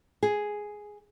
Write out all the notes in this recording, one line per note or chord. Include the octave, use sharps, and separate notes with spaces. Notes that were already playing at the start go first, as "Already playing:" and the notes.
G#4